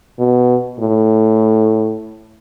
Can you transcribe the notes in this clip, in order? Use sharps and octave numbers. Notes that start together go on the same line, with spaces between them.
B2
A2